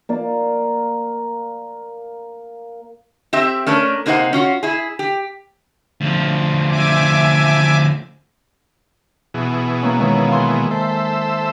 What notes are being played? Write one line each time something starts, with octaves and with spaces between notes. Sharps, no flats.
A#3 D5
C4 G4 E5
A3 C#4 D4 A#4
C3 A#3 D#4 F#4 C5 F#5
C#4 F4 F#4
E4 G#4
G4
D2 F3
E5 G#5 D6
B2 E3 G#4
A#3 C#4
D#3 G#3 A#3
F5 G#5 C6
A4 C5 E5